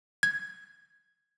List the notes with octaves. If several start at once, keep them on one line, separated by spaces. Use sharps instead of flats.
G#6